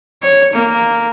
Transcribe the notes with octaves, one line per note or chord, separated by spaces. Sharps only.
C#5
A#3